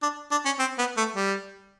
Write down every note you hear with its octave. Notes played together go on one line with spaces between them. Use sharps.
D4
D4
C#4
C4
B3
A3
G3